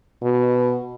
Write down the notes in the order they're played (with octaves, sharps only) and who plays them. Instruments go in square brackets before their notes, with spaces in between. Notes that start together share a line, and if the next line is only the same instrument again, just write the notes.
[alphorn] B2